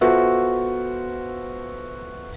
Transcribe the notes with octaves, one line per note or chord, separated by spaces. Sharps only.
B3 F4 F#4 A4 C5 E5